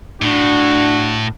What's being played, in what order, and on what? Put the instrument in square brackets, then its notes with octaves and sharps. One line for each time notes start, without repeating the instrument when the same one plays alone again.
[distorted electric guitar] A2 [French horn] D4 [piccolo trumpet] F#4